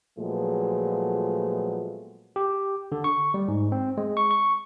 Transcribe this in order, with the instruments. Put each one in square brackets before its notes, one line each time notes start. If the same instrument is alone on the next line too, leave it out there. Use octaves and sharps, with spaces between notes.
[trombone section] A#2 F3 F#3 G#3 A3 B3
[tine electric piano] G4
D3
C#6
G3
G#2
C4
G#3
C#6
C#6